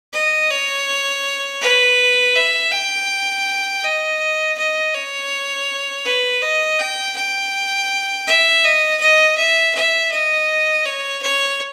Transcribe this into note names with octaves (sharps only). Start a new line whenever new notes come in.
D#5
C#5
B4
E5
G5
D#5
D#5
C#5
B4
D#5
G5
G5
E5
D#5
D#5
E5
E5
D#5
C#5
C#5